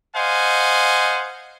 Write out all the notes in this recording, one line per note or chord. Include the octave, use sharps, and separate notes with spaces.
C5 D#5 F5 F#5 G#5